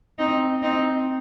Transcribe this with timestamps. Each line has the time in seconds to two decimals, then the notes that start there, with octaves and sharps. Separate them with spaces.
0.19 C4 D#4
0.62 C4 D#4